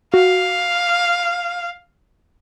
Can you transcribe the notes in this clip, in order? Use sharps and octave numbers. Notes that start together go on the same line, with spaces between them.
F#4 F5